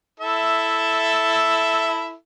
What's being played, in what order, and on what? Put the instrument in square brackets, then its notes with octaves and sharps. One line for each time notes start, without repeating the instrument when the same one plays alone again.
[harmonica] E4 A4 E5